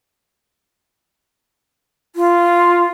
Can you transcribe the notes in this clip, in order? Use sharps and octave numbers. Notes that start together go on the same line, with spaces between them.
F4